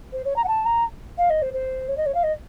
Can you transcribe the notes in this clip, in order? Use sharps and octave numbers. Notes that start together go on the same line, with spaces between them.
C5
C#5
A#5
F#5
A5
A#5
F5
D#5
C5
C5
C#5
D#5
C#5
F5
D#5